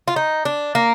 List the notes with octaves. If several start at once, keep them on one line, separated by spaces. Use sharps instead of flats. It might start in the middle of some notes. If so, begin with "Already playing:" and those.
F4
D#4
D4
A#3